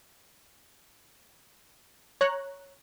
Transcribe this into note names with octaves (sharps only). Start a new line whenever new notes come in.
C#5 A#5 F#6